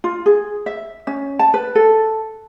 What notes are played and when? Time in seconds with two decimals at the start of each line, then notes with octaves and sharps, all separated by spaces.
0.04 F4
0.26 G#4
0.66 E5
1.07 C#4
1.39 A5
1.54 B4
1.75 A4